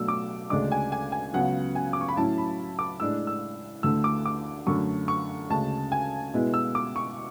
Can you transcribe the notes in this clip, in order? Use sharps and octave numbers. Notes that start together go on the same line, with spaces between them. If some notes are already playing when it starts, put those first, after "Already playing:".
Already playing: B2 F#3 A3 D4 E6
D6
D2 C#3 G#3 D4 D6
G#5
G#5
G#5
C#2 C#3 F#3 B3 F#5
G#5
D6
C#6
B5
A2 F#3 C#4 E4 A5
B5
D6
A2 G#3 D4 E6
E6
D2 D3 A3 E6
D6
D6
F#2 D3 A3 C#6
C#6
D2 C#3 G#3 A5
G#5
B2 G#3 B3 E4
E6
D6
C#6